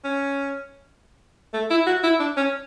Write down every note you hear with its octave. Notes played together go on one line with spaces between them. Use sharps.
C#4
A3
E4
F#4
E4
D4
C#4